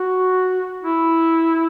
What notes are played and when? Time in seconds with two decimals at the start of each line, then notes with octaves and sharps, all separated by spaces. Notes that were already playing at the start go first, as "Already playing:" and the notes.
Already playing: F#4
0.83 E4